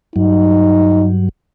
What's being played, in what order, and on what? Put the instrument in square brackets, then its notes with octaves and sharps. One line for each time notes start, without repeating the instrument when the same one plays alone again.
[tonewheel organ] G2 F#3 [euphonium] D#4